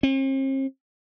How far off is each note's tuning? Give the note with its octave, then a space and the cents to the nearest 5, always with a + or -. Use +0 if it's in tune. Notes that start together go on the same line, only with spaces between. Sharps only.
C4 +45